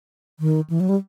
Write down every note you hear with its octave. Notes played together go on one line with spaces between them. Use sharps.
D#3
E3
F#3
G3